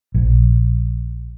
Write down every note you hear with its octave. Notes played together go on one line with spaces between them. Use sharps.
A#1